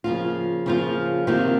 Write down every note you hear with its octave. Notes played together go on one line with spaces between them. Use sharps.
C#3 F3 A#3 F4
C#3 F3 A#3 F4
C3 D#3 A#3 F4